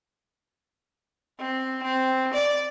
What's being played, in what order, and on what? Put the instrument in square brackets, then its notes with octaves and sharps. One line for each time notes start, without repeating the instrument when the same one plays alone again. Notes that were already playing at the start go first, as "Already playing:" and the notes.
[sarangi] C4
C4
D5